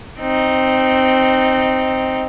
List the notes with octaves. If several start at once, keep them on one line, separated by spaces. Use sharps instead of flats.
C4 D#4